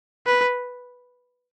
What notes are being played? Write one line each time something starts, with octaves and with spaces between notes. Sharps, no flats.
B4